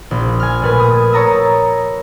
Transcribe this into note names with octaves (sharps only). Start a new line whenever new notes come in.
A#1
G#5 F6
A#2 A3 B4 G#5
D#6
C#5 A5 A#5 D#6 E6